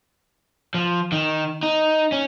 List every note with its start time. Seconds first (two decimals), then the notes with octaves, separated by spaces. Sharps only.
0.74 F3
1.12 D#3
1.63 D#4
2.12 C#4